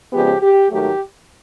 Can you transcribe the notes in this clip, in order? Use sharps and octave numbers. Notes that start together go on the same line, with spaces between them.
C#3 F3 G#3 B3 G4
G4
G#2 D#3 F#3 A3 G4